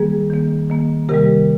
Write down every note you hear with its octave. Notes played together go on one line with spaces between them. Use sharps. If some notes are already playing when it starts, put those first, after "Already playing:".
Already playing: D#3 G3 A#3 G#4
D#3 A#3
D#3 A#3
C3 D#3 G3 G4 A#4